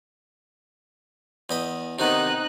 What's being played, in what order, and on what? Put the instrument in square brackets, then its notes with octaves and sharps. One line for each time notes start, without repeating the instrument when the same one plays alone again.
[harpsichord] E2 D#5 B5
[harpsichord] C3 D#3 B3 [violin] D#4 F#6